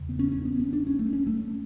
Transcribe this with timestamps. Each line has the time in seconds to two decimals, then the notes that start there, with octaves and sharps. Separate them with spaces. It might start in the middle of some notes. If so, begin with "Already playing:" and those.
Already playing: E2 C#3
0.09 B3
0.19 C#4
0.32 C#4
0.45 B3
0.60 C#4
0.73 D4
0.87 C#4
0.99 A3
1.13 C#4
1.27 A3